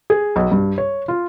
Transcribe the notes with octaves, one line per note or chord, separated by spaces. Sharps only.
G#4
B1
G2
C#5
F4